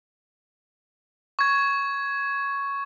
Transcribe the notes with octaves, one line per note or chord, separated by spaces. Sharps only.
C#6 G#6